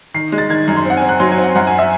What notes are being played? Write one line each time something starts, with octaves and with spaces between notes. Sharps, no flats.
D#3 C7
G#3
A6
D#3 G#6
F#2
C6
C4 F#5
G#5
C4
F#6
F#3 C6
G#5
C4
F#5
F#2 F#5
G#5
E5